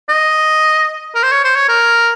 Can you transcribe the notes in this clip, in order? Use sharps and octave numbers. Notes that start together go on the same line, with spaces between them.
D#5
A#4
C5
C#5
C5
C#5
A#4